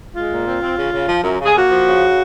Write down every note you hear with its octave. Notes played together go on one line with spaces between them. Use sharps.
G#3 F4
A#2
C4
C4
C#3
C#3
F3
F#2
C#3
G#4
A#3 F#4
F3
C#3